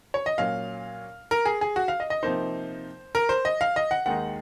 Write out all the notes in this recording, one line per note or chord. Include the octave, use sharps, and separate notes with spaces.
C#5
D#5
A#2 F#3 C#4 F5
A#4
G#4
G#4
F#4
F5
D#5
D#5
C3 F3 A#3 D#4 C5
A#4
C5
D#5
F5
D#5
F#5
D#2 D#3 G#3 D#4 F#5